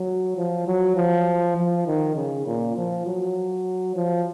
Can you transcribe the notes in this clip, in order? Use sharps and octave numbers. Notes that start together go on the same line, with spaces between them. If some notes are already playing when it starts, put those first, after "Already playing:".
Already playing: F#3
F3
F#3
F3
F3
D#3
C#3
A#2
F3
F#3
F3